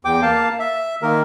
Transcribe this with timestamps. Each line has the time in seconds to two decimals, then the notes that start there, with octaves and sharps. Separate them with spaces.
0.05 E2 G5 D6
0.22 A#3 F5 A5
0.59 E5
1.02 D#3 A#3 A#4